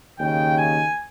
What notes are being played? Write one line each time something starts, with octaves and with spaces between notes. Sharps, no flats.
D#2 C#3 G5
G#5